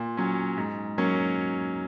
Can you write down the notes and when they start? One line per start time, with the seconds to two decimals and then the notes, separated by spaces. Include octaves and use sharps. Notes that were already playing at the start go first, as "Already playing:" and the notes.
Already playing: A#2
0.17 F#3 C#4
0.57 G#2
0.98 F#3 A#3 C#4